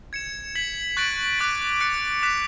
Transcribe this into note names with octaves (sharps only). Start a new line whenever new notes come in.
G#6 C#7 E7
G#6 B6 F#7
C#6 F#6 A6 D7 F#7
D6 F#6 A6 D7
F#6 A6 C#7
D6 F#6 B6 E7